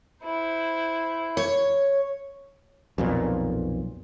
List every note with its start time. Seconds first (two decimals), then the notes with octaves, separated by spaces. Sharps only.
0.23 E4 C5
1.37 C#5
2.98 B1 F2 A#2